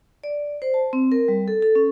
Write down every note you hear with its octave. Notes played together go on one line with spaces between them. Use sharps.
D5
C5
A5
C4
A#4
G3
A4
A4
C#4